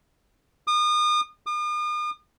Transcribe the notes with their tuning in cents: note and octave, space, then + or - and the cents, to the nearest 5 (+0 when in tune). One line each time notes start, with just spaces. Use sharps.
D#6 -35
D#6 -45